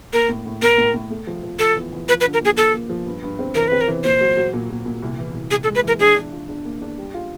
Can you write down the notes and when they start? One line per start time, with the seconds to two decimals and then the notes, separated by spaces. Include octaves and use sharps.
0.13 A#3 A#4
0.29 A2
0.46 A2
0.62 A2 A#4
0.78 A2
0.94 A2
1.10 A3
1.27 F3
1.43 F3
1.59 F3 A4
1.76 E2
1.93 E2
2.08 F3 B4
2.21 B4
2.24 D3
2.33 A#4
2.41 A#3 G#4
2.57 A#3 A4
2.74 A#3
2.89 F3
3.06 G2
3.23 G2
3.39 C4
3.55 E3 A#4
3.68 C4 B4
3.81 A#4
3.88 E3
4.04 A#2 C5
4.21 F#3
4.37 F#3
4.53 A#2
4.70 A#2
4.85 A#2
5.02 C2
5.18 E3
5.34 C2
5.51 C2 G#4
5.64 A4
5.67 G#3
5.75 B4
5.84 E3 A#4
6.00 D4 G#4
6.16 D4
6.32 F4
6.49 D4
6.65 A#3
6.82 D4
6.98 G3
7.14 F4